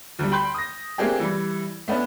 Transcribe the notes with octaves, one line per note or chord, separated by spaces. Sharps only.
D2 G3
G5 B5 C6 G6
D#6 A#6
A3 A#3 C4 D4 G4 G#4
E3 G3
A3 B3 C#4 D4